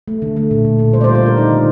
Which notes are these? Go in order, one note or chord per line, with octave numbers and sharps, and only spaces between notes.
A3
D3
A3
A#2
A#2
A#2
G3 C5
D5
C5
F4
C5
D4 A#4
D#4
D3